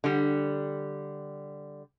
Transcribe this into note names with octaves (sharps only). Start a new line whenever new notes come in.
D3 G3